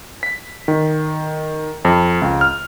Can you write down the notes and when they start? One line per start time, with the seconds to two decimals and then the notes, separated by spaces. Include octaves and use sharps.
0.23 B6
0.68 D#3
1.85 F2
2.22 C#2
2.41 F6